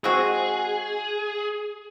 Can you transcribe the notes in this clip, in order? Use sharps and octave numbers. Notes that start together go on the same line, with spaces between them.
G#3 C4 F#4 G#4